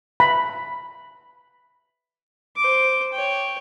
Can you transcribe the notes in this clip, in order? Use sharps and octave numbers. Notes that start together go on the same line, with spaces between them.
B5
C5 D6
C#5 G5